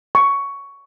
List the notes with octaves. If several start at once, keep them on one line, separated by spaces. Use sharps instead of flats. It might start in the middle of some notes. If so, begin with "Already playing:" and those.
C#6